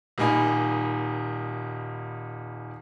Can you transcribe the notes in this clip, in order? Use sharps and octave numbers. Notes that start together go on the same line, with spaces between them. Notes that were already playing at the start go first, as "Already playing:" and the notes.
D#1 G3 A#3 D#4 G#5 B5